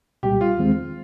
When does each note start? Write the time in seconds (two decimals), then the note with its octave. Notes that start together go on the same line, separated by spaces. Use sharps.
0.23 C2 A#2 G3 G4
0.41 F4
0.58 D#2 D#3 G#3 C4